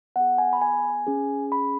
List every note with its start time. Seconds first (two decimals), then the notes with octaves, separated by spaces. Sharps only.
0.16 B3 G#4 F#5
0.38 G#5
0.53 B5
0.61 G#5
1.07 C#4 G#4
1.52 B5